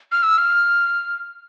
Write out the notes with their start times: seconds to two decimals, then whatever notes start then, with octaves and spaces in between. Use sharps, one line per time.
0.12 F6
0.23 E6
0.38 F6